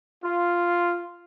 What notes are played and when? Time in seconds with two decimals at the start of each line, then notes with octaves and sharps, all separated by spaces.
0.21 F4